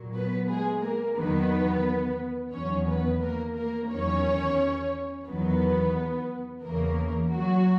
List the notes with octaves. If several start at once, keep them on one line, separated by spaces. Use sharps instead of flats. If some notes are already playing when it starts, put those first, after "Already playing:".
Already playing: A#2 F#3
B3 B4
G#3 G#4
A#3 A#4
E2 D#3 F#3 B3 B4
E2 D#3 F#3 C#4 C#5
B3 B4
A#3 A#4
A#3 A#4
E2 D#3 F#3 C#4 C#5
E2 D#3 F#3 B3 B4
E2 C#3 E3 A#3 A#4
F#3 F#4